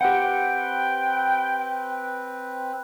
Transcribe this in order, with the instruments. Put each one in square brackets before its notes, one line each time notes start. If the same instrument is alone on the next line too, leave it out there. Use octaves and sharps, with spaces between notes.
[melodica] C4 B4 [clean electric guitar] G4 F#5 [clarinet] G5